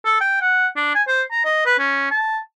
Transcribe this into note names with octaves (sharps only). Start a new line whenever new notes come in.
A4
G5
F#5
D4
G#5
C5
A#5
D#5
B4
C#4
A5